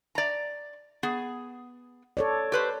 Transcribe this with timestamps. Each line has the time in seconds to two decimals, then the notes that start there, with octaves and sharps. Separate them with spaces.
0.15 D5 A#5
1.03 B3 G#4
2.17 A4 C#5 D5
2.52 G4 B4 C5